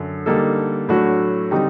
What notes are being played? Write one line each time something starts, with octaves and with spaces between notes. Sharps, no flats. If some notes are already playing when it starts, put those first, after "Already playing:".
Already playing: F#2 D3
D3 G3 A#3 D#4 A4
A2 F#3 A3 D4 F#4
D3 G3 C4 D#4 G4